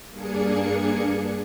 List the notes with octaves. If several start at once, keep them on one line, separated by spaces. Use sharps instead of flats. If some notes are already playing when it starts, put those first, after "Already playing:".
G2 A#3 D4 G#4 G#6 C#7